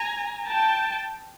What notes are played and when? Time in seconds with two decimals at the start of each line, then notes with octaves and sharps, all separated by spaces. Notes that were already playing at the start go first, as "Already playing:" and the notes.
Already playing: G#5 A#5
0.47 G5 A5